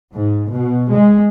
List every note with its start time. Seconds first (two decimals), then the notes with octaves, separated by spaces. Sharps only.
0.15 G#2
0.52 B2
0.94 G#3